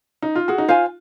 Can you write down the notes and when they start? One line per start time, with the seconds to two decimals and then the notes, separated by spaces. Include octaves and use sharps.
0.22 D#4
0.35 F4
0.48 F#4 G#4
0.58 D#4
0.68 F4 C5 F5 G#5